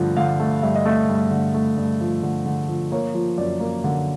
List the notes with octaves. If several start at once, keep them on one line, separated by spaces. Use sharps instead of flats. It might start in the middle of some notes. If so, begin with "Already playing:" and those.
Already playing: G2 D3 F3 A3
D3 F5
A3
G2 E5
D#5
A3 E5
G2
D3
A3
G2
F3
D3
D3
F3
A#3 C#5
F3
F#2 D5
A#3
D3